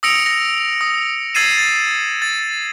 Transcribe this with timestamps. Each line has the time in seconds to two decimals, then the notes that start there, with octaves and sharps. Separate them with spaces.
0.03 D#6 E6 A#6 C#7 D7 F7
0.26 A#6
0.81 D#6
1.35 E6 G#6 A6 C7 D#7 E7
1.58 A6
2.22 A6